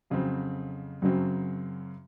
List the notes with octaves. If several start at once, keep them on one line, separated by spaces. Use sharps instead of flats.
F2 C#3 F#3 C4
F#2 C#3 F#3 C4